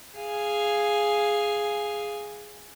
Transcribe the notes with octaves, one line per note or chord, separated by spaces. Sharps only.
G#4 F5 G#5